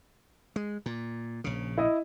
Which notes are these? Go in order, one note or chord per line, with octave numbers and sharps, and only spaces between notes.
G#3
A#2
A#1 C#3
E4 D#5